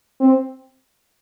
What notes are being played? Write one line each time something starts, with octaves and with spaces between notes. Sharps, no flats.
C4